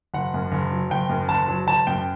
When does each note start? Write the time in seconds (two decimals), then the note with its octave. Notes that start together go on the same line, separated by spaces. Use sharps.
0.14 F#1 F#5
0.34 F#2
0.52 F#1
0.71 F#3
0.90 F#1 G5
1.09 F#2
1.29 F#1 A5
1.48 F#3
1.67 F#1 A5
1.87 F#2 G5